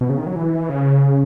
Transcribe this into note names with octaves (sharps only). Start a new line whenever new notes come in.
B2
C#3
D#3
F#3
E3
C#3